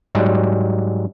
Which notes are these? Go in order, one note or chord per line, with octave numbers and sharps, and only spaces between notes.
G#2 F#3 G3 D#4